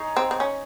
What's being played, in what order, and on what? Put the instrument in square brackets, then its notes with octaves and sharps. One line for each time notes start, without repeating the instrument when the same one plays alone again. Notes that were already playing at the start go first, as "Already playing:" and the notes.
Already playing: [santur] D#4 G#4 C#5
[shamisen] C4
C4
C#4